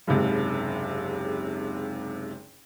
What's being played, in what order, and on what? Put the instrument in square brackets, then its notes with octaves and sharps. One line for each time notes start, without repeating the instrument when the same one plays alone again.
[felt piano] F#1 C#2 G#2 C3